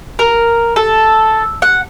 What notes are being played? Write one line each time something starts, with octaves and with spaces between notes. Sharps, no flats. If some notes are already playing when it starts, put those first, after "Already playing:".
A#4
A4
F#5